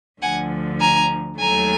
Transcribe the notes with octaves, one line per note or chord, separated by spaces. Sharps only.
D2 D3 F3 F#5 G#5
G#5 A#5
D#2 D#3 F#3 A3 G#5 A#5